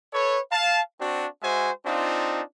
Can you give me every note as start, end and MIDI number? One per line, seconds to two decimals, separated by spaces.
0.13 0.39 69
0.13 0.39 71
0.13 0.39 73
0.51 0.81 77
0.51 0.81 81
1.00 1.27 60
1.00 1.27 62
1.00 1.27 66
1.42 1.70 56
1.42 1.70 66
1.42 1.70 72
1.42 1.70 76
1.42 1.70 80
1.86 2.42 60
1.86 2.42 62
1.86 2.42 63
1.86 2.42 65